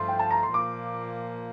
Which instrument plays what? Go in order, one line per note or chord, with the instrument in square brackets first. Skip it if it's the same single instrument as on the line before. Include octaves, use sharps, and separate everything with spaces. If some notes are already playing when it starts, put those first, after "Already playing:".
Already playing: [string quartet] G2 F3 A3 [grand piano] C6
[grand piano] G5
A5
A#5
C6
[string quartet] A#2 F3 A#3 [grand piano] D6